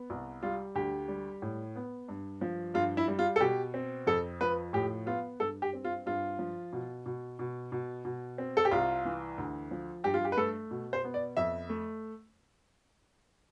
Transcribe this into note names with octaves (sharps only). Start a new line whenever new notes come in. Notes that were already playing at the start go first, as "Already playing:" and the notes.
Already playing: B3
C2
G3 F4
D2 G4
G3
A2
B3
G2
F3
G2 F4
E4
G3
F4
A4
B2 G4
C4
F2 A4
F3 B4
A2 G4
B3 F4
G2 A4
G4
C4
F4
G2 F4
F3
B2
B2
B2
B2
B2
C4
A4
G4
C2 F4
E3
D2
F3
G2 G4
F4
G4
B4
A3 A4
B2
C5
B3
D5
F2 E5
A3